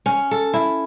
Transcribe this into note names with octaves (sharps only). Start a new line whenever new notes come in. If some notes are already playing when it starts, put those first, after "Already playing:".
C#4
A4
E4